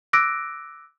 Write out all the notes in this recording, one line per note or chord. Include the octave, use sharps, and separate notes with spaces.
D6 E6 F#6 A#6 D7